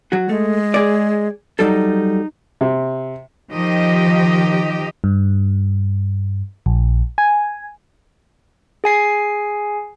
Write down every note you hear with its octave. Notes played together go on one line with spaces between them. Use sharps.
F#3 F#4
G#3 A3
G#4 D5
F#3 G3 D#4 A4
C3
D#3 F3 G4 D#5
G2
A#1
G#5
G#4 G#5 C7